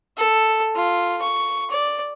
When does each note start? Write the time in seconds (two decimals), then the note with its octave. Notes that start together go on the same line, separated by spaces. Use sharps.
0.17 A4
0.75 F4
1.22 C#6
1.70 D5